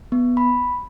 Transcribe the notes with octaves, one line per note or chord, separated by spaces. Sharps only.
B3
B5